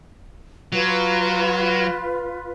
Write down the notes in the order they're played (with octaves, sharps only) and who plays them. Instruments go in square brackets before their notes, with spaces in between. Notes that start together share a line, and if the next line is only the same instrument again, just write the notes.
[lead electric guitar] F#3 [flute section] F4 B4